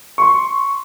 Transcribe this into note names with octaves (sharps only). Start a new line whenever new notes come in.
C6 C#6